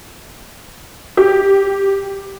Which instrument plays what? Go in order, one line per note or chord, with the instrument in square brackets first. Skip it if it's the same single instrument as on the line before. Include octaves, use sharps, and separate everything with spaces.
[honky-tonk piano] G4